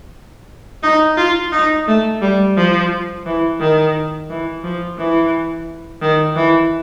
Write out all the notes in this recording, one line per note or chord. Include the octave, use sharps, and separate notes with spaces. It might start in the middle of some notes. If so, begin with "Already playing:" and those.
D#4
F4
D#4
A3
G3
F3
E3
D#3
E3
F3
E3
D#3
E3